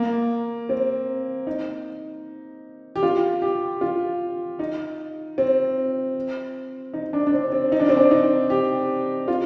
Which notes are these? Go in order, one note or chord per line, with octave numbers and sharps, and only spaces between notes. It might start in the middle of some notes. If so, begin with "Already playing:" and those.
Already playing: A#3
C4
D#4
G4
F4
G4
F4
D#4
C4
D#4
D4
D4
C4
C4
D#4
D4
C4
D4
D#4
G4
F4